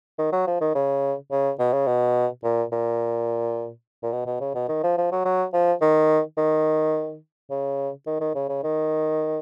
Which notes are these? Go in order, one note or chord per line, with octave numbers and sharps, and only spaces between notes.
D#3
F#3
F3
D#3
C#3
C#3
B2
C#3
B2
A#2
A#2
A#2
B2
B2
C#3
B2
D#3
F3
F3
F#3
F#3
F3
D#3
D#3
C#3
D#3
D#3
C#3
C#3
D#3